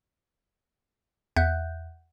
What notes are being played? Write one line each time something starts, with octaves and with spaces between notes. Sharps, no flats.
E2 E5 F#5 F#6 G6